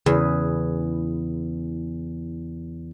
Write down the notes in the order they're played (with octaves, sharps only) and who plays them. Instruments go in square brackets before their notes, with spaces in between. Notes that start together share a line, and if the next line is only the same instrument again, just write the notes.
[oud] E2 [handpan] C#3 G#4 B4